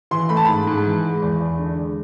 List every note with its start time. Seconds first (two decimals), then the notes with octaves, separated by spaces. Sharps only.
0.11 E3 C6
0.29 A3 B5
0.37 A5
0.45 G#2 B5
0.67 G#2
0.85 E3
1.04 G#3
1.22 E2
1.40 E2
1.59 D3
1.78 G#3